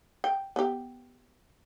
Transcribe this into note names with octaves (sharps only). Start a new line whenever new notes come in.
G5
B3 G4